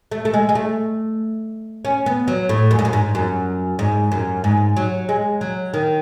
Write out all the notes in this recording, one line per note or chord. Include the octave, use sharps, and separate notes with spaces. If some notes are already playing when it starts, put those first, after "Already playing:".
A3
A3
G#3
G#3
A3
C#4
B3
F#3
A2
F#2
G#2
F#2
G#2
F#2
G#2
F#2
G#2
F#3
G#3
F#3
D#3